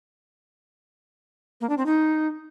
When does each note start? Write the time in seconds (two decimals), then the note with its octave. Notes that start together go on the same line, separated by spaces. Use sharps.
1.61 A#3
1.69 D4
1.78 C4
1.86 D#4